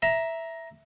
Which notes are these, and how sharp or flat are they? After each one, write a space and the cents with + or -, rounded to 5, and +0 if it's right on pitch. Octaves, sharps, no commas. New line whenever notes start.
E5 +0 A#5 +10